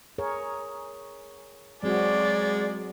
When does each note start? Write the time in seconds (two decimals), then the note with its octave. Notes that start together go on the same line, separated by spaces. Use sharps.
0.18 G#4 A#4 C#5
1.83 F#3 G#3 C4 F#4 D5